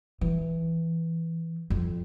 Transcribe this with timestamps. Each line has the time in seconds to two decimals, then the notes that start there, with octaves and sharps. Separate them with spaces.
0.21 E3
1.70 F2